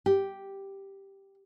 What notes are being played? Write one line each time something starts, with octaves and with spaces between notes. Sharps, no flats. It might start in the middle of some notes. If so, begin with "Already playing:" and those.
G4